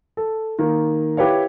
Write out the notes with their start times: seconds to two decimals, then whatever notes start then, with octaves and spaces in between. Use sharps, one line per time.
0.17 A4
0.59 D#3 A#3
1.17 E4 G4 B4 C#5 F5